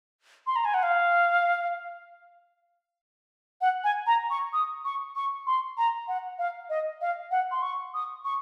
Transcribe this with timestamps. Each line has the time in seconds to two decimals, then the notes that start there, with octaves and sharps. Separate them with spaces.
0.47 C6
0.56 A#5
0.65 G#5
0.74 F#5
0.83 F5
3.61 F#5
3.84 G#5
4.07 A#5
4.30 C#6
4.53 D#6
4.85 C#6
5.16 C#6
5.47 C6
5.78 A#5
6.08 F#5
6.39 F5
6.70 D#5
7.01 F5
7.31 F#5
7.51 C6
7.62 C#6
7.94 D#6
8.25 C#6